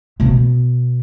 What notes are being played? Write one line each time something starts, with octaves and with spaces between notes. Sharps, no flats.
B2 B3